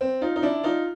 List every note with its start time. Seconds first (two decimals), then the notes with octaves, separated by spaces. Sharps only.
0.01 C4
0.21 D#4 F4
0.36 D#4
0.42 D4 E4
0.64 D#4 F4